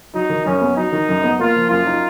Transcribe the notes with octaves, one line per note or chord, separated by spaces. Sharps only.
F#3 D#4
D#3
F#2 C#4
B3
F#3 D#4
D#3
F#2
B3
A#3 F4
F3
F#2 F4
D#4